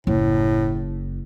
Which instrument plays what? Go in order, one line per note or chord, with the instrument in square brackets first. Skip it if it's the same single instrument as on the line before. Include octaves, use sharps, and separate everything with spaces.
[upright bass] F#1 E4 [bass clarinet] A2